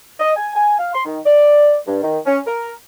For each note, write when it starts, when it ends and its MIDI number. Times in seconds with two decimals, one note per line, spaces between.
0.20 0.32 75
0.36 0.54 80
0.56 0.76 80
0.79 0.93 77
0.94 1.05 84
1.05 1.19 51
1.26 1.76 74
1.87 2.01 43
2.03 2.18 51
2.26 2.39 61
2.47 2.71 70